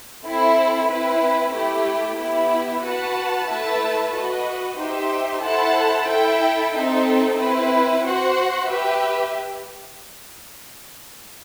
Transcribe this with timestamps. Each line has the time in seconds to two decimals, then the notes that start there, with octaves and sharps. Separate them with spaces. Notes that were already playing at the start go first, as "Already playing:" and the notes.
0.24 C4 E4 A4
0.90 C4 E4 B4
1.54 A3 E4 G4
2.19 B3 E4 G4
2.84 F#4 B4 F#5 A5
3.49 A3 E4 B4 E5 A5
4.14 F#4 B4 D#5
4.79 D#4 G4 C5 E5
5.43 E4 A4 C5 F#5 A5
6.08 E4 A4 E5 G5
6.74 C4 D#4 A4 E5
7.38 C4 E4 B4
8.04 F#4 C5 F#5
8.68 G4 B4 E5